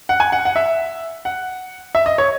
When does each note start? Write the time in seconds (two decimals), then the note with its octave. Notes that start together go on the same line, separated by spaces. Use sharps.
0.09 F#5
0.20 G#5
0.32 F#5
0.45 F#5
0.56 E5
1.25 F#5
1.95 E5
2.06 D#5
2.18 C#5